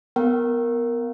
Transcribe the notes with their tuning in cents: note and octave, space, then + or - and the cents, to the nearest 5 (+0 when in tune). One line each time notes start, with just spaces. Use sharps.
B3 +0 A#4 +0 G5 -45